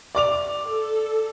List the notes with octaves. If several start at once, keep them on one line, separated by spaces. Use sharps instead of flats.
D5 D6 F7
A4